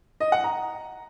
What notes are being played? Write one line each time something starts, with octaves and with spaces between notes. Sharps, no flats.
D#5
F#5
A#5